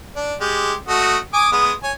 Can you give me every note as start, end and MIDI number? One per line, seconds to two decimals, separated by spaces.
0.16 0.35 62
0.41 0.73 56
0.41 0.73 67
0.88 1.17 57
0.88 1.17 66
0.88 1.17 75
1.33 1.47 80
1.33 1.47 86
1.33 1.47 87
1.52 1.72 56
1.52 1.72 59
1.52 1.72 87
1.83 1.92 73
1.83 1.92 80